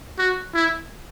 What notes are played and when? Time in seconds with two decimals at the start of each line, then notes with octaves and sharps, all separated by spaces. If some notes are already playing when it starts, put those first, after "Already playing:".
0.18 F#4
0.54 E4